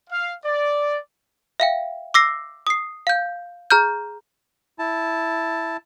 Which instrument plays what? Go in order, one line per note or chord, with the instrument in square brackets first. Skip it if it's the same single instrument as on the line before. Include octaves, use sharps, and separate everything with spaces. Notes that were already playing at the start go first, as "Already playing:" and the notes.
[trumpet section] F5
D5
[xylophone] E5 F5 G5
D6 E6 A#6 C7
D#6 C7
F5 G6
G#4 A#5 F6 G6
[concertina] E4 A5